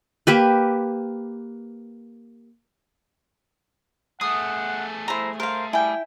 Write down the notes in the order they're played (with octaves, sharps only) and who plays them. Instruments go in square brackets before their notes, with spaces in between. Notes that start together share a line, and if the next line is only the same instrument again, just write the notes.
[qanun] A#3 G4 B4
[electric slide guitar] A3 G#4 [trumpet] F#5 [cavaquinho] D#6
[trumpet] E4 [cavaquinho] C5 A#5
[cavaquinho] A#4 F5 [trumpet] C5
[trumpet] G3 [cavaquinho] E4 G5 [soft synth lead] G#5